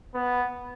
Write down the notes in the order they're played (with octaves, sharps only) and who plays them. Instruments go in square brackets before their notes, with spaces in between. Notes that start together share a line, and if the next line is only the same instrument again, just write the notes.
[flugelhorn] B3